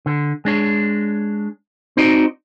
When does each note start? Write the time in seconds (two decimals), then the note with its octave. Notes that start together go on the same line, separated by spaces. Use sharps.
0.06 D3
0.45 G#3 D4 C#5
1.97 C4 D#4 F#4 D5 D#5